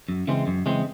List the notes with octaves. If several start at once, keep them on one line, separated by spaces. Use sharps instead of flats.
F#2
C#3 E3 G#3 C4
F#2
C#3 E3 G#3 C4